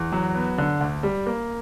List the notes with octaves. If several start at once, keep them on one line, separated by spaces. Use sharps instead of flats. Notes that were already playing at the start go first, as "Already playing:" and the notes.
Already playing: E2
F#3
B3
D3
D2
G3
A#3